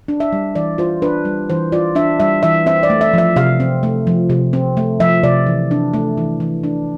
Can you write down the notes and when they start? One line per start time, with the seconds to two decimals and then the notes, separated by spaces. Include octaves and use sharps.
0.08 D4
0.20 E5
0.33 G3
0.55 E3 D5
0.78 F4 C5
1.02 D4 B4
1.25 G3
1.50 E3 C5
1.72 F4 D5
1.95 D4 E5
2.20 G3 E5
2.43 E3 E5
2.66 C4 E5
2.83 D5
2.90 A3
3.01 E5
3.14 F3 E5
3.36 C3 F5
3.60 C4
3.83 A3
4.07 F3
4.30 C3
4.53 C4
4.77 A3
5.00 F3 E5
5.23 C3 D5
5.46 E3
5.71 D4
5.94 A3
6.17 E3
6.40 E3
6.63 D4